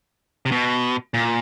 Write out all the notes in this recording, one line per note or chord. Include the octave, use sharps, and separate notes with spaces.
C3
B2
A#2